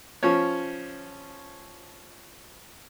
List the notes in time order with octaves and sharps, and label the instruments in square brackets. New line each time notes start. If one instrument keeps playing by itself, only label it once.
[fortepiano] F3 C#4 C#5